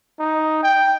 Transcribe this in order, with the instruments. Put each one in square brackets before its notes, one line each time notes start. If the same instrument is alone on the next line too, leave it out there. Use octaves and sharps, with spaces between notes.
[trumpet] D#4
G5